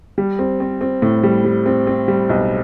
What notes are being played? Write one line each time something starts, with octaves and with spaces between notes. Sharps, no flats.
G3
C4
C4
C4
A2
G3
G3
C4
C4
G3
B1